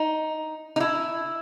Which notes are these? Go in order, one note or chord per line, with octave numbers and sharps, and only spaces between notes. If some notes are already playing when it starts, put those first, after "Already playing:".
Already playing: D#4
D#4
E4